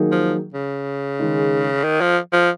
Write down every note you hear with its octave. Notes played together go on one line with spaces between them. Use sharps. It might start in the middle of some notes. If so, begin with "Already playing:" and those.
Already playing: D#3 F#3 A#3 D#4 G#4
F3
C#3
D#3 G#3 D#4
D#3
F3
F3